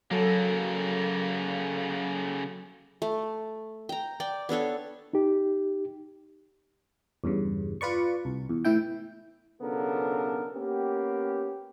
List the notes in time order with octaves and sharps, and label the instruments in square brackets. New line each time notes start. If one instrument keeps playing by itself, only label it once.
[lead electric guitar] C#3 A#3 [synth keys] F#3 A4
[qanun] A3
G5 A#5
D5 G5
B3 D4 A4 C#5
[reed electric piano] D#4 G4
[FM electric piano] E2 G2 C#3
F4 B4 D5 C#6
C2
E2
A2 E3 E4 G5
[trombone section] B1 C#3 B3 D4 A4 A#4
A#3 B3 C#4 G4